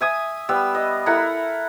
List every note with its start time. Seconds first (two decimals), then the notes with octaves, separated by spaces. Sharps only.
0.01 E5 G#5 D#6
0.49 G3 B3 E6
0.74 D#5
1.06 E4 A4 A#4 F#5